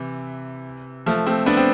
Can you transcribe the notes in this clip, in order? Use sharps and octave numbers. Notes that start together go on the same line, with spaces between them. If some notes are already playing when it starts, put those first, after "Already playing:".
Already playing: C3 E3
F3 A3
A3 C4
B3 D4
C4